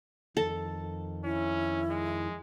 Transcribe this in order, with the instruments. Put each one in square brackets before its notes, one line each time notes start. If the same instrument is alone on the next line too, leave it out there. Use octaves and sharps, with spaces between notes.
[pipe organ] F2 D#3 [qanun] A4
[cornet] C#4 [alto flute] E4
[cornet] G#3